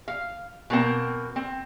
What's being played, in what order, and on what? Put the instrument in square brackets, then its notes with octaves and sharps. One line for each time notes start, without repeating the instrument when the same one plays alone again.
[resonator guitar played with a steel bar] F5
B2 A#3 C4
C4